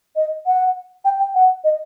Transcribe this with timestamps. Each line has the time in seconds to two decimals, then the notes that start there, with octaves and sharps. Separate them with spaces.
0.16 D#5
0.46 F#5
1.05 G5
1.19 G5
1.35 F#5
1.64 D#5